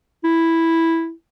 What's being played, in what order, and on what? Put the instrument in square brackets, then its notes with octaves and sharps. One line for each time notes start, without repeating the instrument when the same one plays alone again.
[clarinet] E4